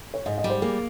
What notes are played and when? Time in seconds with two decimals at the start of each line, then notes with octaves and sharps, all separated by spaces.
0.14 C#5
0.26 G#2 D#5
0.38 D#5
0.44 G3
0.50 C5
0.62 A#3 G#4